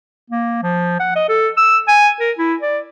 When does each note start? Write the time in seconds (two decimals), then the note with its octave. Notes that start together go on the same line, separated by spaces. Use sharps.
0.30 A#3
0.63 F3
1.00 F#5
1.16 D#5
1.29 A4
1.57 E6
1.88 G#5
2.20 A#4
2.39 E4
2.62 D5